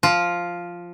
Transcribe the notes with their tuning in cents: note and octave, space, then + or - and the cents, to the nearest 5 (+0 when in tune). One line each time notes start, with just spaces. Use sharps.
F3 +0 F4 +0